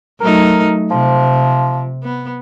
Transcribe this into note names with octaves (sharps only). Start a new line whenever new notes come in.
F#3 A3 D#4 A#4
C3 F3
B3